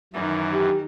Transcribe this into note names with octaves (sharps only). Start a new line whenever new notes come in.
F#2 D#3 E3
G4